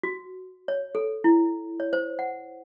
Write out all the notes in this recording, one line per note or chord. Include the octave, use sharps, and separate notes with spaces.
F#4
C#5
A4
E4
C#5
C5
F#5